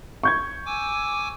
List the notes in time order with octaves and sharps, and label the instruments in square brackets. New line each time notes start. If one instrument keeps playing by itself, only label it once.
[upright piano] C#6 G6 G#6
[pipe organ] G#5 D6 E6